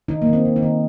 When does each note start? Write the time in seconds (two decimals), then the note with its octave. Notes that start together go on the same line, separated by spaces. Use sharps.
0.08 D#3 D#4
0.22 A#3
0.27 D#3
0.33 C4
0.45 D#3
0.56 D#4
0.63 D#3